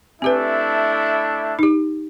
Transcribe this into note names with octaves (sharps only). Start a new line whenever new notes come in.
A3 C4 D4 E4 G4 B4
D#4 G4